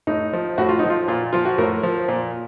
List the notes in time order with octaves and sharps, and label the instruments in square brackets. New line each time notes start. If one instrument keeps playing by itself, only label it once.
[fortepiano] A2 D#4
F3
A2 F#4
F4
F3 D#4
F4
A#2 F4
F3 F4
F#4
A2 A#4
F3
A#2